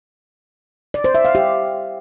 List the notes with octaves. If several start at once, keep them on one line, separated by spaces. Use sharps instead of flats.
D5
C5
E5
F5
G4